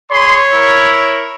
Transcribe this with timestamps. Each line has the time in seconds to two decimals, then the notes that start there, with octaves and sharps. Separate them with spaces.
0.11 G#4 C#5 B5 C6
0.53 E4 A#4